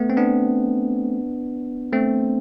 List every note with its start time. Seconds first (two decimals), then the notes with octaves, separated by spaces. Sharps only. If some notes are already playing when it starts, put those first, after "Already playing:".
Already playing: A3 B3
0.10 C4
0.17 B3 D4
1.93 A3 C4